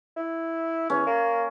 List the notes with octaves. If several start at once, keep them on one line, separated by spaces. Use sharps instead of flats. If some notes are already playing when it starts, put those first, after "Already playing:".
E4
E2 C#4
A#3